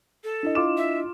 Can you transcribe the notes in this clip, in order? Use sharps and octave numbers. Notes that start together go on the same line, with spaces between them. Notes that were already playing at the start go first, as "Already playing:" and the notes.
A4
D4 E4 D#5
F4 D6 E7
E5